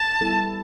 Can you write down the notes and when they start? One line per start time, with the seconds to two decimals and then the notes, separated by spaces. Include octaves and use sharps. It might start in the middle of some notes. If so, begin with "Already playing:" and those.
Already playing: A5
0.21 G3 B3 E4 A4